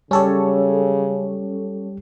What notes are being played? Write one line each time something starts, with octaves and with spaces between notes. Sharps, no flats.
C#3 G3 C#4 G4 A4 C#5